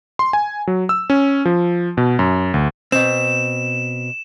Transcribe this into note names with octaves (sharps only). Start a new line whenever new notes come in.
C6
G#5
F#3
E6
C#4
F3
B2
F#2
D2
B2 C4 E7